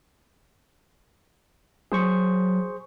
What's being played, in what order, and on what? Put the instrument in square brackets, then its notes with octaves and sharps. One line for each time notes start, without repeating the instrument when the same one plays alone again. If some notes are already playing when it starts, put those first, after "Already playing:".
[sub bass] F#3 [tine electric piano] G#4 C5 C#6